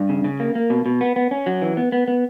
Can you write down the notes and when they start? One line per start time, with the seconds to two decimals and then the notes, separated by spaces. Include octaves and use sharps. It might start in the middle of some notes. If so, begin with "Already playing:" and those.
Already playing: G2
0.09 C#3
0.24 C#3
0.40 A#3
0.55 A#3
0.70 B2
0.86 B2
1.01 B3
1.16 B3
1.31 C#4
1.46 F#3
1.62 E3
1.77 B3
1.92 B3
2.08 B3